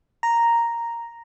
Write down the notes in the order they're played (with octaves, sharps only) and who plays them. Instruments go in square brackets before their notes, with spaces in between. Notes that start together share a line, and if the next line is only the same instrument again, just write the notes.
[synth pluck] A#5